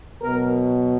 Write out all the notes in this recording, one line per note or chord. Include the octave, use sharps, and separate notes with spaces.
B2 F#3 B3 A#4